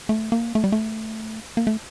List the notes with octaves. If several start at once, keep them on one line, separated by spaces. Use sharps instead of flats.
A3
A#3
A3
G3
A3
A#3
A3